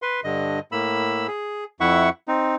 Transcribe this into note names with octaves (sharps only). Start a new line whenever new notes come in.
B4 C6
G2 D3 D#5
A2 A#3 B5 E6
G#4
F2 E4 E5 F#5 C#6
C4 D#4